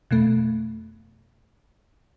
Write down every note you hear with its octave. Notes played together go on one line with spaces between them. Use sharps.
F2 B2 A3